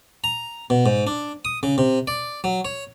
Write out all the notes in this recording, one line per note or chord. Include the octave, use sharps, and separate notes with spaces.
A#5
B2
G#2
D4
D#6
C#3
C3
D5
F#3
C#5